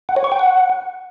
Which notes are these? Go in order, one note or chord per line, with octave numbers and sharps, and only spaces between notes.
F#5
C#5
C#6
G5
F#5